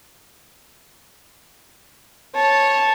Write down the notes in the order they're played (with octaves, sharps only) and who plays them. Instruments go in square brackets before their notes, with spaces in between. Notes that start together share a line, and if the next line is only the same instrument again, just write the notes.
[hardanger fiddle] C#5 A5